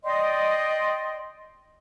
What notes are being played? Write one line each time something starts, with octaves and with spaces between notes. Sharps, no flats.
D5 D#5 G5 C6